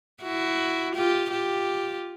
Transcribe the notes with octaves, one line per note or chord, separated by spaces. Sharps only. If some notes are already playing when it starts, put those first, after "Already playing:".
E4 F#4
F4 G4
F4 G4